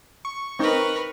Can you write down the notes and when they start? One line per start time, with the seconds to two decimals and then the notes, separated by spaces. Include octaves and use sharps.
0.25 C#6
0.59 C4 D#4 A#4 B4